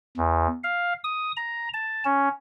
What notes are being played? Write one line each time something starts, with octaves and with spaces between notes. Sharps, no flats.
E2
F5
D#6
A#5
A5
C#4